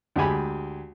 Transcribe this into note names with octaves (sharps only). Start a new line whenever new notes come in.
D2 G#3 G4 G#5 B5